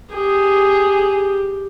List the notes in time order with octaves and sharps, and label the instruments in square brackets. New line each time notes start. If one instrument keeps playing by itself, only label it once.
[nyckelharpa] G4 [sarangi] G#4